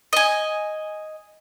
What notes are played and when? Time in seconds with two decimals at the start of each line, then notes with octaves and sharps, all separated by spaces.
0.13 D#5 G#5